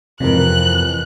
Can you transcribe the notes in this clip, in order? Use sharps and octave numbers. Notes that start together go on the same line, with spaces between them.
F2 C3 E3 A#4 F#6